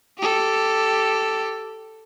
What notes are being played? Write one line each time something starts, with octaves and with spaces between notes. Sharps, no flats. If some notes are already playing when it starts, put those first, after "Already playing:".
G4 A4